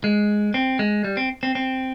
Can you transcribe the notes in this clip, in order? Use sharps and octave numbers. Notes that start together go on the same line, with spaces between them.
G#3
C4
G#3
G3
C4
C4
C4